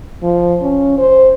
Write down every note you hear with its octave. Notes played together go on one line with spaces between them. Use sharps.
F3
C#4
C5